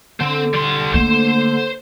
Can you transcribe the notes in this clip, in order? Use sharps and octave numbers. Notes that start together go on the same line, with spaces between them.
D3 C4 C5
G3 C6
A3 A#3 C5